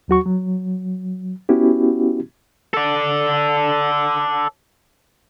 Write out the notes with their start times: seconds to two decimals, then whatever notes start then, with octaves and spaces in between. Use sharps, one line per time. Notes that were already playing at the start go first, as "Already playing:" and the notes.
0.08 D#2 F#3 F#4 C#6
0.26 F#3
1.49 B3 C#4 E4 F#4 G4
2.74 A4 D5